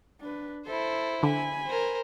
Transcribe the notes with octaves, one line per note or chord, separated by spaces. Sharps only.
D4 B4
E4 A4 C5
D3 G#5 B5
A#4 C5